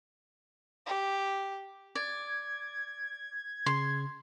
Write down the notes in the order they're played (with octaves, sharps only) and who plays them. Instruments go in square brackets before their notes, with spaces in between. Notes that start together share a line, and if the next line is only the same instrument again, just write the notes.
[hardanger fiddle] G4
[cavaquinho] D5 [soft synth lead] G#6
[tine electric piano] C#3 [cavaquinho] C6